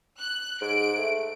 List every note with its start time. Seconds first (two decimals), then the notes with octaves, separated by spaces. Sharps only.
0.20 F#6
0.61 G#2 D7
0.98 A3